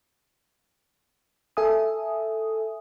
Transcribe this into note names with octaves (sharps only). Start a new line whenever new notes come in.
A4 E5 G#5 D#6